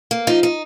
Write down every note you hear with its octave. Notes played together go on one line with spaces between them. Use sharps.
A#3
F3 D#4
D#4